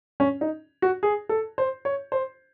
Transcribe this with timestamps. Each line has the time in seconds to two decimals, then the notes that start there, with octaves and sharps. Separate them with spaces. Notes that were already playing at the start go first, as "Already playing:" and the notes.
0.20 C#4
0.41 D#4
0.82 F#4
1.03 G#4
1.29 A4
1.58 C5
1.85 C#5
2.12 C5